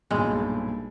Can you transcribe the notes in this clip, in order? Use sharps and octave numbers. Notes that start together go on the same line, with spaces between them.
B1 G2 A#2 G#3